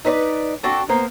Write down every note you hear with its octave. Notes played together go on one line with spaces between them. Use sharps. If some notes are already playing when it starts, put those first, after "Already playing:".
D#4 B4 C5 D5
C4 D4 F#4 A4
A#3 B3 A#4 C5